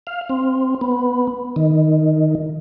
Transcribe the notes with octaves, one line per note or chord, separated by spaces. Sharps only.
F5
C4
B3
D#3